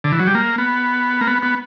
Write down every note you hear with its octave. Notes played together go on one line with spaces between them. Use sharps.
D3
E3
F#3
G3
A#3
B3
A#3
B3
B3